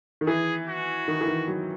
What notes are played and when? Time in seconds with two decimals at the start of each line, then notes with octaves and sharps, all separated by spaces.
0.21 D#3
0.27 E3 G#4
0.67 F#4
1.08 D#3
1.21 E3
1.27 D#3
1.48 F#3